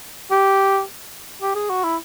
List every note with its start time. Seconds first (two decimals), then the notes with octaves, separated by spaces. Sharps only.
0.31 G4
1.42 G4
1.55 G#4
1.70 F#4
1.84 E4